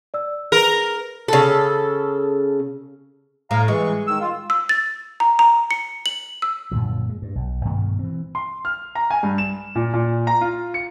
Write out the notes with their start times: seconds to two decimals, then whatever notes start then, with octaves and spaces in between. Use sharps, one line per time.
0.14 D5 E6
0.52 G#4 A#4 B4
1.28 C#3 A4
3.51 A2 F5 A#5
3.68 E3 G#3 C#6
4.07 D#3 E6
4.20 F4
4.50 E6
4.69 A6
5.20 A#5
5.39 A#5
5.71 C#7
6.06 F#7
6.42 E6
6.71 F#2 A#2 D3 F3
7.09 G#3
7.22 G2
7.36 B1
7.65 G2 B2 D#3 A3
7.99 E3 C4
8.35 C6
8.65 F6
8.95 A#5
9.11 G#5
9.23 G2
9.38 E7
9.75 A#2
9.93 A#2
10.27 A#5
10.41 F4
10.74 C#7